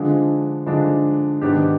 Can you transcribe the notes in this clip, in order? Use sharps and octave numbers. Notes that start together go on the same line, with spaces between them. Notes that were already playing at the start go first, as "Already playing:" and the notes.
Already playing: D3 F3 G#3 D4
D3 F3 G#3 D4
G#2 D#3 B3 D4 G4